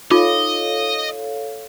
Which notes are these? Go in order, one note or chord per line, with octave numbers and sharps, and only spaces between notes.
D#4 F4 A4 C#5 D#5 F5 D6